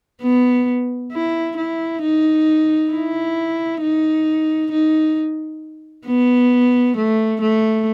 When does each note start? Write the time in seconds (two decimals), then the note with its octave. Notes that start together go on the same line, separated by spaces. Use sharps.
0.22 B3
1.12 E4
1.57 E4
2.02 D#4
2.92 E4
3.82 D#4
4.71 D#4
6.06 B3
6.97 A3
7.41 A3